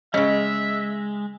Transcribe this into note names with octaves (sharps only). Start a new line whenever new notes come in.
C#3 G#3 C#4 D#5 E5